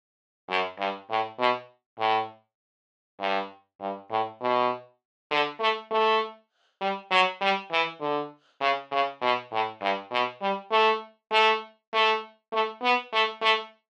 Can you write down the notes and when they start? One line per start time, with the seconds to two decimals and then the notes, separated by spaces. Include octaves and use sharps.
0.49 F#2
0.79 G2
1.10 A2
1.39 B2
1.99 A2
3.20 G2
3.81 G2
4.11 A2
4.41 B2
5.31 D3
5.60 A3
5.91 A3
6.81 G3
7.11 F#3
7.41 G3
7.71 E3
8.01 D3
8.61 C#3
8.92 C#3
9.22 B2
9.52 A2
9.82 G2
10.11 B2
10.41 G3
10.71 A3
11.32 A3
11.93 A3
12.52 A3
12.83 B3
13.13 A3
13.42 A3